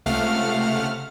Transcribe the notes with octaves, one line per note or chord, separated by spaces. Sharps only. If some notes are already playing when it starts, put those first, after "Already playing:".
C#2 C3 A3 F5 F#5 F6